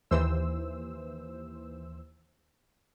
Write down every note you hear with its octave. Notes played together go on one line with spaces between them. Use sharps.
D#2 E3 C5 E6